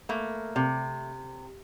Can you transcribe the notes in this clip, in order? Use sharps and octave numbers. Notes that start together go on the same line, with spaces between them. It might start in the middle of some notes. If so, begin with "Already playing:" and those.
A3 A#3
C3